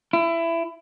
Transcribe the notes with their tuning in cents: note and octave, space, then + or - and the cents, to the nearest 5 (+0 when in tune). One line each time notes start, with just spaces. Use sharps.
E4 +20